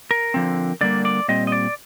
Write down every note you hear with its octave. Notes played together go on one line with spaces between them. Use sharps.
A#4
D3 F3 C4
D3 G3 A#3 D5
D5
A#2 G3 C4 D#5
D#5
D5